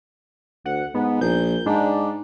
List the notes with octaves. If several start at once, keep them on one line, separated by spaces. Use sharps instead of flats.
D2 F#5
G#2 B3
A#1 G6
G#2 D4